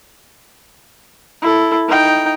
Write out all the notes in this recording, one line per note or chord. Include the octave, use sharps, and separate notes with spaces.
E4 A4
D#4 G5